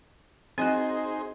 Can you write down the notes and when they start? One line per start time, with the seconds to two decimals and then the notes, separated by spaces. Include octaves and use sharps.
0.58 C4 D#4 F#4 G#4 C5 D#5 G#5